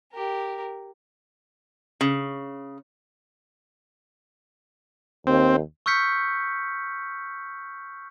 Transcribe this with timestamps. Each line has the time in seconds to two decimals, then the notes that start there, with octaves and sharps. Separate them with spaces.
0.12 G4 A#4
2.01 C#3
5.27 D#2 C4
5.86 C#6 E6 F6 G6 B6 C#7